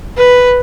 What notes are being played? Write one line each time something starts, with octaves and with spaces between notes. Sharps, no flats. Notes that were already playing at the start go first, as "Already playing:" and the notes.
B4